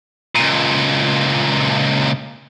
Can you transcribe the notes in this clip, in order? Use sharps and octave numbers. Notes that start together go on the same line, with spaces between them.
C#2 A#2